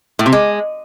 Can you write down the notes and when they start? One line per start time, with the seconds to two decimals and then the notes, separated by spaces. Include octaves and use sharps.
0.19 A2
0.26 C3
0.32 G#3